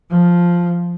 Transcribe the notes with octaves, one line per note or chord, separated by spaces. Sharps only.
F3